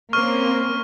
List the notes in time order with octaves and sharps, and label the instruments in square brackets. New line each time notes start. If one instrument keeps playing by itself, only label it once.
[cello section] A#3 C4 C#4 [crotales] C#6 F6